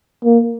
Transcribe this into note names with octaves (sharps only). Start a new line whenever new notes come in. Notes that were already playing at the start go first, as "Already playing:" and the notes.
A#3